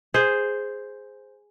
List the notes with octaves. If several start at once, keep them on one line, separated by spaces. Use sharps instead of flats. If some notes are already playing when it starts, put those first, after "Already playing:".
G#4 C5